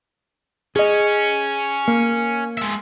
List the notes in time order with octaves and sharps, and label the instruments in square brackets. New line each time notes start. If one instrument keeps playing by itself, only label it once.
[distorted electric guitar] C#4 [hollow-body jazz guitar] G#4 D#5
[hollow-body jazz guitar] A#3
[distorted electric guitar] G#3 E5